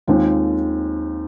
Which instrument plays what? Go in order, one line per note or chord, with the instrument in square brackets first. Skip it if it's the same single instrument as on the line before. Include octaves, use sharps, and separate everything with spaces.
[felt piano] D#2 D#3 G#3 C4 F4